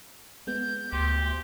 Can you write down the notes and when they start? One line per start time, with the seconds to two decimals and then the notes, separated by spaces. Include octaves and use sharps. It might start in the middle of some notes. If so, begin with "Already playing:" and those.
0.47 G#3 B3 G6
0.92 D2 G4 C6